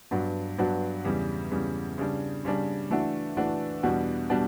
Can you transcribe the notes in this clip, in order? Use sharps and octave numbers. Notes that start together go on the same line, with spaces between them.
G2 F#3 B3 D4 F#4
G2 F#3 B3 D4 F#4
E2 C#3 G3
E2 C#3 G3
C#3 G3 D4
C#3 G3 D4
E3 A3 D4 F#4
E3 A3 D4 F#4
E2 B2 G3 D4 F#4
B2 G3 D4 F#4